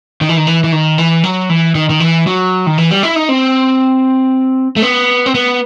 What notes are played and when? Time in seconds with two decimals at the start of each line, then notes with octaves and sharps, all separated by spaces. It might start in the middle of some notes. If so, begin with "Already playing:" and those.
0.21 D#3
0.29 E3
0.37 D#3
0.47 E3
0.64 E3
0.72 D#3
0.98 E3
1.24 F#3
1.50 E3
1.75 D#3
1.90 D#3
2.00 E3
2.27 F#3
2.67 D#3
2.78 E3
2.91 G3
3.03 E4
3.16 D#4
3.29 C4
4.76 A3
4.82 B3
5.26 C4
5.35 B3